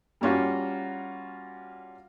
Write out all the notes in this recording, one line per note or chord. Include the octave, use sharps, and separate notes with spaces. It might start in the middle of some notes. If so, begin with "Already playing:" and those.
G3 A#3 C#4 F4 F#4